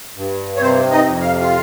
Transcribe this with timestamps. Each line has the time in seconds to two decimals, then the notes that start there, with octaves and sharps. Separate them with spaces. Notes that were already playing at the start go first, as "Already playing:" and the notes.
0.17 G2
0.57 C#5
0.61 C3 C4 C5
0.91 D#4 D#5
1.06 F2
1.21 F5
1.41 F4 F5